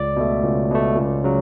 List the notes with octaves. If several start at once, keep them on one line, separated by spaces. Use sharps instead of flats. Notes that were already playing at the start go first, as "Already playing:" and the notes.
Already playing: C#2 D5
B2 A3
C#2
B2 A3
C#2
C#3 F#3